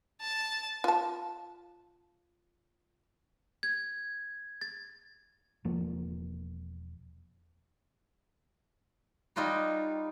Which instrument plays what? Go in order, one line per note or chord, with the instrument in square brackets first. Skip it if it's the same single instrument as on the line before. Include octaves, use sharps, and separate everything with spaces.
[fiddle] A5
[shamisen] F4 A5
[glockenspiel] G#6
A6
[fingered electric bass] E1 F3 A#3
[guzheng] G3 D#4 F4 F#4 C#5